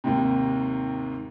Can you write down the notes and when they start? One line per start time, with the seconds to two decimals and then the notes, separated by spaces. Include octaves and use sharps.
0.04 D#2 G#2 C3